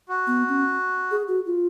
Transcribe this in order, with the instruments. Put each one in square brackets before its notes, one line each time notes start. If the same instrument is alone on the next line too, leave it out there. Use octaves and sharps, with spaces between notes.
[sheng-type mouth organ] F#4
[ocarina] B3
C#4
G#4
F#4
F4